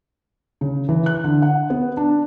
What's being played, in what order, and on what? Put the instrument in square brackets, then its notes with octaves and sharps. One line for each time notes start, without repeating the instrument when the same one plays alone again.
[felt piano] C#3
E3
F#6
D3
F#5
B3
D4